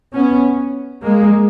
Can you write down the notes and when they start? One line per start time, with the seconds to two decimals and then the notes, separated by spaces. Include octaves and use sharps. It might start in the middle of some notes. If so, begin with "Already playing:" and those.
0.14 B3 C#4
1.03 G#3 A#3